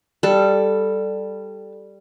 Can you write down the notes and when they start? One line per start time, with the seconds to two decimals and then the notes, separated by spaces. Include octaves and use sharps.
0.23 G3 A4